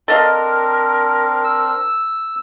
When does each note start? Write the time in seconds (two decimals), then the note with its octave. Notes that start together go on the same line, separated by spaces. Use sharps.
0.08 C4 D4 A4 A#4 D#5 F5
1.44 E6